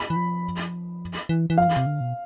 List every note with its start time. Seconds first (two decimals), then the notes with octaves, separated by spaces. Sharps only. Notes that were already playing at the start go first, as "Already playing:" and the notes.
Already playing: B5
0.10 E3
0.16 F3
1.29 E3
1.50 E3
1.58 F3 F5
1.67 E3
1.77 C3
1.86 D3
2.01 B2